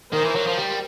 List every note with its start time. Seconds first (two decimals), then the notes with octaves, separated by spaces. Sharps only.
0.13 D#3 A#4 C5
0.25 E3
0.36 F#3
0.47 F3
0.58 G3